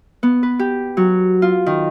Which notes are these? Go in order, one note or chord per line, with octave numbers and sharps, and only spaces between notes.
B3
B4
G4
F#3
F4
D#3